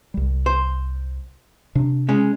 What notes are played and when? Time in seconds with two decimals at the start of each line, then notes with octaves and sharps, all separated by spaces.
0.14 C2 G3
0.46 C5
1.75 C3 D4
2.09 G#3 C#4